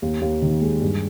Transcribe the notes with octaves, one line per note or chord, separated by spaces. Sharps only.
D#2
D#2
D#3
G#3
G2